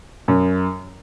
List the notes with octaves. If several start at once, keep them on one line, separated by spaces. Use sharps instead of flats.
F#2